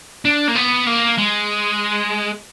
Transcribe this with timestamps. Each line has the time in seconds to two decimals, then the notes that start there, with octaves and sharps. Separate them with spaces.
0.25 D4
0.48 A#3
0.56 B3
0.87 A#3
1.18 G#3